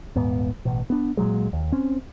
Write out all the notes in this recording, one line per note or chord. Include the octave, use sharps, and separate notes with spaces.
D#1 G#2 B3
A1 B2
B3 D4
A#2 C#3 F#3 G#3
D#2
C4 C#4